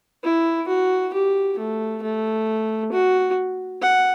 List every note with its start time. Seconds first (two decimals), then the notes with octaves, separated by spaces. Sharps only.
0.24 E4
0.68 F#4
1.14 G4
1.58 A3
2.02 A3
2.92 F#4
3.82 F#5